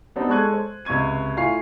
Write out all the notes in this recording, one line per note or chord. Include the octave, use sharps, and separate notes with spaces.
G3 B3 C4 D4 D#4
G#3 A4 C#6 F#6 G#6 D#7
C5
C#2 C3 C#6 G#6 D#7
A2 F4 F5 G#5 C#6 C7